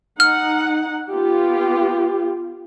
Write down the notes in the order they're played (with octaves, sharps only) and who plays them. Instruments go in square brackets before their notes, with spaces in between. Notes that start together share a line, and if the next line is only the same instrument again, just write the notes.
[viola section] D#4 F#5 [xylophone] F6
[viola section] B3 F4 G4